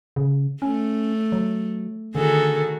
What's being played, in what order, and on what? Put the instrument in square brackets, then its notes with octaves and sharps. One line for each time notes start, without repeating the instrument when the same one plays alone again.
[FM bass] C#3
[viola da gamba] A3 [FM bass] C#4
[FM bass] F#3
[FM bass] D3 [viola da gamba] D#3 F#4 [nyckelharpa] G#4 A4